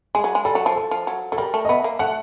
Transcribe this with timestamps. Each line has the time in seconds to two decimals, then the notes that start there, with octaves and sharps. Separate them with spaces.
0.15 G#3 G#4
0.24 F#3
0.35 G#3
0.45 G3 A4
0.55 F#3
0.66 F3
0.76 A4
0.91 F3
1.07 F#3
1.32 F#3 A4
1.38 G3 A#4
1.54 A3
1.65 D#5
1.69 B3 E5
1.84 A#3
1.99 A3 F#5